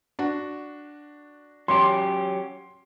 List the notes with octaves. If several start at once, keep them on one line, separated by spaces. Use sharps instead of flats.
D4 F#4
F#3 C#4 G4 C6